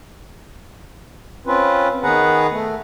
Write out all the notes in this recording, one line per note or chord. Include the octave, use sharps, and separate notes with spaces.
C4 C#4 F4 B4
D#3 B3 G#4 B4 F#5 A#5
A3